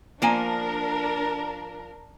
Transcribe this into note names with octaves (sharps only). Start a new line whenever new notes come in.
F3 A#3 D4 A#4 G#5